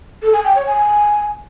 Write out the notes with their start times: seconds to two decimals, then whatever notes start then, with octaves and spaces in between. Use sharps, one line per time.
0.22 A4
0.33 G#5
0.45 G5
0.56 C#5
0.67 G#5